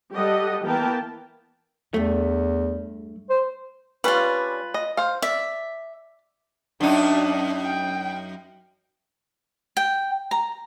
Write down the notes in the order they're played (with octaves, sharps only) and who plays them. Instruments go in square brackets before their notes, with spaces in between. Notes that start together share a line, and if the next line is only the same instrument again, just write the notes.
[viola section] G3 G4 A4 D#5 F#5
E3 A#3 B3 A#4 G5 A5
[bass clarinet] E2 [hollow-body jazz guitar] G2 A3
[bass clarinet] C5
[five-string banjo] G3 C#4 D4 [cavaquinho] F4 B4
[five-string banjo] D#5
C5 F5
[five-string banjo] D5 [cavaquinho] E5
[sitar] F#2 D#4 [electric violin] D4
[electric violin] G5
[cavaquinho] G5
A#5